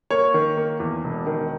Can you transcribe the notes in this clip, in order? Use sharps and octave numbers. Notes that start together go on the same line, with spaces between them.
A#3 C#5
D#3
A#3
E2
E1
D#3